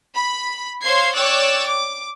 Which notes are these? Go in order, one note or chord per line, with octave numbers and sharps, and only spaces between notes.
B5
C5 C#5 F5 C6 G#6 C7
C#5 D5 G5 E6 F#6 A6
D6